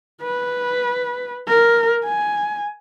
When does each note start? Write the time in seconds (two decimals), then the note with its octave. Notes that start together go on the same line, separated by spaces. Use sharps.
0.22 B4
1.48 A#4
2.05 G#5